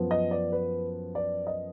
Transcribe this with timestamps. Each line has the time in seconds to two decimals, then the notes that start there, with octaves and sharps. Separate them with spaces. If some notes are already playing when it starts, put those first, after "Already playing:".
Already playing: F#2 F3 B3
0.11 D#5
0.31 D5
0.52 B4
1.15 D5
1.47 D#5